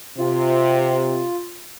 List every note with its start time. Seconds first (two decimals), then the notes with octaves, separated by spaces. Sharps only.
0.18 C3 F4